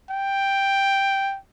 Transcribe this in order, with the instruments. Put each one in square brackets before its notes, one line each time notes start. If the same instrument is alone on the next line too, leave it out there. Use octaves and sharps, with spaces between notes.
[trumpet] G5